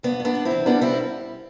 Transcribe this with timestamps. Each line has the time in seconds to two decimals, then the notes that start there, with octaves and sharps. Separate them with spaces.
0.03 G2 B3 D4
0.20 G2
0.25 B3 D4
0.35 G2
0.45 C4 E4
0.51 E3
0.66 G3 B3 D4
0.81 G3 C4 E4